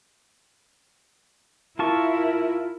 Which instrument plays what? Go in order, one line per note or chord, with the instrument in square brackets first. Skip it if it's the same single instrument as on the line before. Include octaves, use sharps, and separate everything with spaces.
[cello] E4 A#4 [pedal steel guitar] F4 A5 C#6